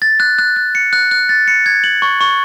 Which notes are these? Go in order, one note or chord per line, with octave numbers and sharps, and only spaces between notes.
A6
F#6
F#6
F#6
C#7
F#6
F#6
A6
C#7
G#6
F#7
C#6
C#6